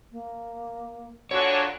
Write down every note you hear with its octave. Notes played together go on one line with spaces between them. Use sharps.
A#3
A#2 D3 D4 F#4 G#4 C#5 F#5